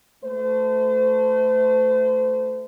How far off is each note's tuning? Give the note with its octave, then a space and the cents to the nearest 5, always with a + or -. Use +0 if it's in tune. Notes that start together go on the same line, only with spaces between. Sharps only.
A3 +0 C5 -35